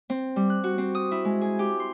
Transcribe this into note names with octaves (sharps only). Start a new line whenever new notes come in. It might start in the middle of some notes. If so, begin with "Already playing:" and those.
C4
G3
F#6
F#4
C4
D#6
E4
G#3
G#4
G4
C6